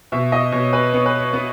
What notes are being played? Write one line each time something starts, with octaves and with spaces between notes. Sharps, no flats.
B2 E5
D#5
B2 C#5
B4
B3 C#5
B4
C#5
B3